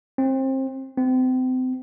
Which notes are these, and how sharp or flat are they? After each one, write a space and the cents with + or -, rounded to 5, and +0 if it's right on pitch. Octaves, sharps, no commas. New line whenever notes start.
C4 +25
C4 -35